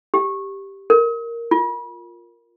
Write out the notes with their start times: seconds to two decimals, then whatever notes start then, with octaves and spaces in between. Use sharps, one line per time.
0.14 G4
0.90 A#4
1.51 F4